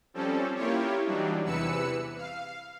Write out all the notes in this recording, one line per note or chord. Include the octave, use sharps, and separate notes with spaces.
F3 G3 C4 C#4 A4
A#3 E4 F4 G4 C#5
E3 F#3 G3 D4 D#4
E2 C3 E3 B4 E6 C#7
F5